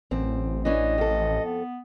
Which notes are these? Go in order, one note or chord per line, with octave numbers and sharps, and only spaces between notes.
A1 F#2 C4
E3 C#4 D4 D#5
F2 A4
B3